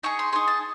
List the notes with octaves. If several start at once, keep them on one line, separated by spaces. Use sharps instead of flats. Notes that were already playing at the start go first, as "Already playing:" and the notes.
D#4 G#4 C#6
C6
D#4 G#4 C6
A5